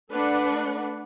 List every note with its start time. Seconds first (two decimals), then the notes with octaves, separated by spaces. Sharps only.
0.11 A3 D4 B4 F#5